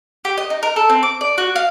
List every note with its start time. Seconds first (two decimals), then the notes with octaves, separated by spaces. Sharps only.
0.25 G4
0.38 D#5
0.50 D#4
0.63 A#4
0.76 A4
0.90 C4
1.03 D6
1.21 D5
1.38 F#4
1.56 F5